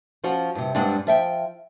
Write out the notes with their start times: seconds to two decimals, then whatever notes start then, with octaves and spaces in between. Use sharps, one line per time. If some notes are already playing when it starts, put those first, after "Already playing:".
0.24 F3 C#4 F4 F#4
0.55 G2 C3
0.75 G2 G3 G#3 C4 D4 F#5
1.07 F3 E5 G5